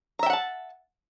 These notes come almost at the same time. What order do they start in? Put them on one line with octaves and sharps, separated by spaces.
A#5 E5 G5 F#5 A5